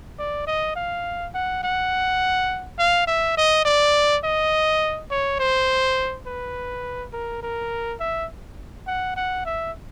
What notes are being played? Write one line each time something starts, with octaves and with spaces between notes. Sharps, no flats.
D5
D#5
F5
F#5
F#5
F5
E5
D#5
D5
D#5
C#5
C5
B4
A#4
A#4
E5
F#5
F#5
E5